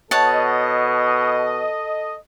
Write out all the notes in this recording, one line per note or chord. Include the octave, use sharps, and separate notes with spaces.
B2 A4 C#5 D#5 F#5 A5